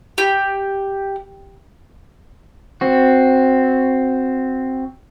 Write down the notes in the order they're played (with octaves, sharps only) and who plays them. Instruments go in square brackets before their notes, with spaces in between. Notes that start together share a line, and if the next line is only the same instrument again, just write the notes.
[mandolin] G4
[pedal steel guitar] C4 F#4